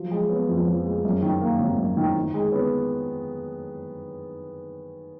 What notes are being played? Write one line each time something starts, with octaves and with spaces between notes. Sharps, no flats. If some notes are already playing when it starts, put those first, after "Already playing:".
Already playing: F3 F#3
G#3
B3
F2
F3
G#3
F#2
D#3
A#3
G#1
F#2
D#3
D#3
G#3
B3